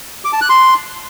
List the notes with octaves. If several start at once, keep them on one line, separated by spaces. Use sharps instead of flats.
D6
A5
F#6
C6